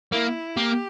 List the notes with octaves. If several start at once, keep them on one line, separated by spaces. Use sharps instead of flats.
A#3 E4
A#3 G4